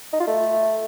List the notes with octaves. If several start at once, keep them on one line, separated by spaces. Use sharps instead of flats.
D#4
F4
A3